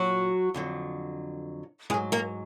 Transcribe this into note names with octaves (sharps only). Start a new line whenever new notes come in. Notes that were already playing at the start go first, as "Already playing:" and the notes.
Already playing: A#2 F#3 F#4
F2 D3 F#3
G#2 F#3 G#3 G#4
A#3 A#4